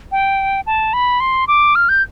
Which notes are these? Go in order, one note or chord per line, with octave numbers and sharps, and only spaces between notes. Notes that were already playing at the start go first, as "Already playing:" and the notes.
G5
A5
B5
C6
D6
F6
G6